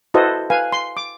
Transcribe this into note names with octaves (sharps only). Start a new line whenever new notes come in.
E4 F#4 A4 B4 C5 D#5
B4 F5 G#5
C6
D6